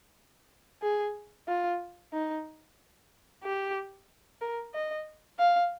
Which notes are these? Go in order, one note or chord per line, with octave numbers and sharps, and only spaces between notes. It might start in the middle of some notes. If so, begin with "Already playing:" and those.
G#4
F4
D#4
G4
A#4
D#5
F5